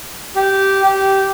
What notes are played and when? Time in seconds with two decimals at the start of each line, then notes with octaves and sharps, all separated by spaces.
0.36 G4
0.83 G4